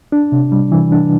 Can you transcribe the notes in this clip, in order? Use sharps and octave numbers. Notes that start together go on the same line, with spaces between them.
D4
C3
G3
E3
D4